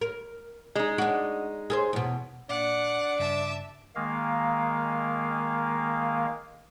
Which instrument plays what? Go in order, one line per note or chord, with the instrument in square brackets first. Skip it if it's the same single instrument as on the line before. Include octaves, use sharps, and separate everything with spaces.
[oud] A#4
[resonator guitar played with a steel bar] G#3 D#4
[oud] D4 F#4
G#4 A4 C5
E2 B2
[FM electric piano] A#2 [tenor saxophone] D4 [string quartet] F#5 [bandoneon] D6
[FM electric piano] G2 C#3 [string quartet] E5 A5
[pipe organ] D#3 G#3 A#3 F5